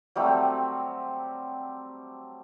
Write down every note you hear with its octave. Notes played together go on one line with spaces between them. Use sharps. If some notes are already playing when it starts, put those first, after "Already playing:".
F#3 G3 A3 C4